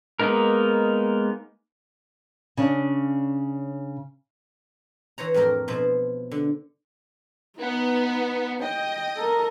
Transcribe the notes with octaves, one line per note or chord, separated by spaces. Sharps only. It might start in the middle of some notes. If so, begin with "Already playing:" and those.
G#3 A#3 B3 D#4 A#4
C#3 C#4 D4
E3 C5 C#5 A#5
F2 A2 A#3 A#4 G5
B2 F3 E4 C5
D3
B3 D#4
D#5 G5
A4 A#4